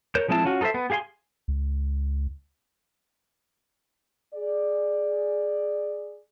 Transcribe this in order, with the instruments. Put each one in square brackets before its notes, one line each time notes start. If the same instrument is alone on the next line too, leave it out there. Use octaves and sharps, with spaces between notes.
[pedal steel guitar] A#4 C#5 G6
F3 G#3 C4 E4 A5
C#4 F4 F#4
D#4 A4 A#4 C5 E5
B3
G4 G#4 F5 G#5 C6
[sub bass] C#2
[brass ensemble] G#4 D5